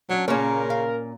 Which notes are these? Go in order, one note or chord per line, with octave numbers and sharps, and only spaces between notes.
F#3 C#4 D4
A#2 C#3 A#3 C#4 A#4 C#5
F5